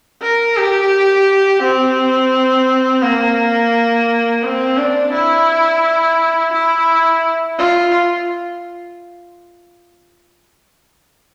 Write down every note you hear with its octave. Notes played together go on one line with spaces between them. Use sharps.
A#4
G4
C4
A#3
C4
D4
E4
E4
F4